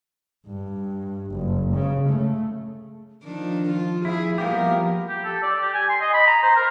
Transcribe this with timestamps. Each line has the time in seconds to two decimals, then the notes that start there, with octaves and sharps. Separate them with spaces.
0.46 G2
1.31 F#1
1.73 C#3
2.09 A3
3.23 D#3 F3 D4
3.69 F4
4.05 E4 G#4
4.38 F3 G3 A#3 B3 G4 A#4 F5
5.09 G4
5.25 A4
5.43 D5
5.61 G4
5.74 G#5
5.90 C6
6.01 D#5
6.14 B5
6.27 A#5
6.43 C5
6.56 A#4